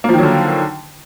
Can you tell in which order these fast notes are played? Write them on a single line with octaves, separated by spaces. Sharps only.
A#3 F3 D#3 F#3 D3